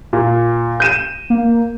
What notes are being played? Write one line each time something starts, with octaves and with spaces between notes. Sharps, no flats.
A#2
G6 D#7 E7
A#3